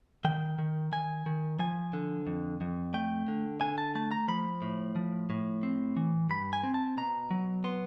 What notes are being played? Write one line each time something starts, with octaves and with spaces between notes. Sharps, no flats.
D#3 G5
D#3
D#3 G#5
D#3
F3 G#5
D3
F2
F2
A3 G5
D3
D3 G#5
A5
A3 A5
A#5
F3 B5
A2
F3
A2
C4
E3
G2 B5
G#5
C4
A5
B2 A#5
F#3
B3 C6